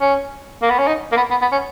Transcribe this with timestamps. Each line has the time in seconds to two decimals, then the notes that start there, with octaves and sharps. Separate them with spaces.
0.01 C#4
0.62 A#3
0.70 B3
0.79 C#4
0.87 D#4
1.12 A#3
1.16 B3
1.31 B3
1.41 B3
1.52 C#4